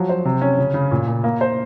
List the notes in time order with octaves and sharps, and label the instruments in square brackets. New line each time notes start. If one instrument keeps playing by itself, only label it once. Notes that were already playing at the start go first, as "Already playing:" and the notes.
Already playing: [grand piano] F3 F#3
C5
C3
C#4
C#3
C#3
A#2
A#2
A#3
C5